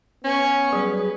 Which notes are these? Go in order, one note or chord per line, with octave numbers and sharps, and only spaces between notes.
B3 C#4 G#5 C#6
F#3 G3 G#4 B4